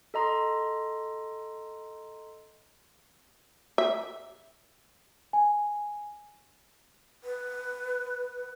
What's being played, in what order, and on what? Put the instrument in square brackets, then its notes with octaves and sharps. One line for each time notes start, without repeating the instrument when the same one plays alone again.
[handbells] A4 D#5 A#5 C6
[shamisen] E5
[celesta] G#5
[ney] B4